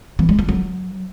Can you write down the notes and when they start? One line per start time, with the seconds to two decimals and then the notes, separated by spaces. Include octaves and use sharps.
0.19 E3
0.29 G#3
0.39 D4
0.49 F#3